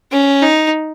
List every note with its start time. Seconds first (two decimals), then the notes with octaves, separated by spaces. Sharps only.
0.12 C#4
0.42 D#4